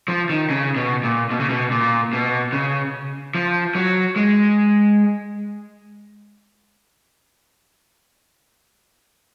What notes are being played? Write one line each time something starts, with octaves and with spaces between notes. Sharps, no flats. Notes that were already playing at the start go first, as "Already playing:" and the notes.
F3
D#3
C#3
B2
A#2
B2
C#3
B2
A#2
B2
C#3
F3
F#3
G#3